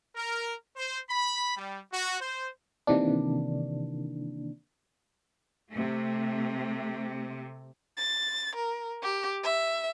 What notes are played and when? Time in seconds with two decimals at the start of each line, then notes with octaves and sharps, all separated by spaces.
0.15 A#4
0.76 C5
1.09 B5
1.57 G3
1.92 F#4
2.21 C5
2.87 C3 D#3 E3 A#3 D4
5.71 C3 A3
7.97 A6
8.56 A#4
9.02 G4
9.43 E5